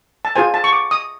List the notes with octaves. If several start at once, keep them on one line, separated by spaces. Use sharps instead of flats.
A5
F4 G#4 C5 G#5
A5
C#6
D6
D#6